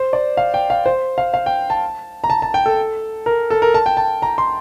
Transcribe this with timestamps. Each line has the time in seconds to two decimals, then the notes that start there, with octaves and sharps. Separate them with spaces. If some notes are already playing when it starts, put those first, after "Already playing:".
Already playing: C5
0.13 D5
0.37 F5
0.54 G5
0.70 F5
0.86 C5
1.18 F5
1.34 F5
1.46 G5
1.70 A5
2.24 A#5
2.30 A5
2.42 A5
2.54 G5
2.66 A4
3.26 A#4
3.50 A4
3.62 A#4
3.74 A5
3.86 G5
3.97 A5
4.22 A#5
4.38 C6